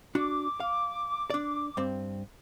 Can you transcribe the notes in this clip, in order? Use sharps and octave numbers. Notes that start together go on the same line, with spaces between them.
D4 F#4 D6
F5
D4 D5
G2 C4